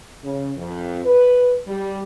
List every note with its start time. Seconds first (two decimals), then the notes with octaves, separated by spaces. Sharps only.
0.23 C#3
0.56 F2
1.05 B4
1.67 G3